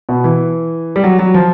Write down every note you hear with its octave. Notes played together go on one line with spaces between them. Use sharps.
B2
E3
G3
F#3
F#3
F3